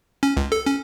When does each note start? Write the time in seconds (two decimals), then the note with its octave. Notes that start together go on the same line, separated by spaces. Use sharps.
0.23 C#4
0.37 C#2
0.52 A4
0.66 C#4